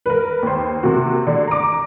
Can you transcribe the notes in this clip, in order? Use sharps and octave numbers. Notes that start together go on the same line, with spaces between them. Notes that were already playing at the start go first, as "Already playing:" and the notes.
A#4 B4
D#2 C5
C3 A#3 F#4
D3
A#5 D6